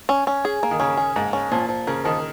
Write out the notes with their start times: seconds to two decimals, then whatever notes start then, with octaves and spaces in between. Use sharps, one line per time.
0.09 C#4
0.27 C#4
0.45 G#4
0.63 A#3
0.71 D#3
0.80 C#3 C#4
0.97 G#4
1.16 G#2 A#3
1.33 C#4
1.51 A#2 F3
1.69 F3
1.87 C#3 A#4
2.04 D#3 F3